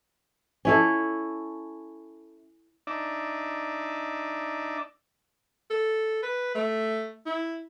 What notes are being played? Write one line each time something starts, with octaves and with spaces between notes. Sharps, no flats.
C#4 E4 A4
D4 D#4 D5 E5
A4
B4
A3
E4